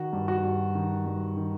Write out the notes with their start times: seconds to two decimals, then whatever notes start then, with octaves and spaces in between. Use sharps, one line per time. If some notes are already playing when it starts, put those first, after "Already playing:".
Already playing: D#3 F#4
0.13 G2
0.28 F#4
0.44 G2
0.75 D#3
1.06 G2
1.37 D#3